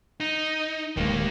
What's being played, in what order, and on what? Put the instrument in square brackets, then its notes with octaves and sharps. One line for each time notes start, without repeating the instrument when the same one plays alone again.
[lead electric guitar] D#4
[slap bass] D1 G#3 [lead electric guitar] D#3 A#3